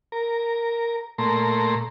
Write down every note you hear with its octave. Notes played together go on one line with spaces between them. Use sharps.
A#4
A#2 A3 A#5 C6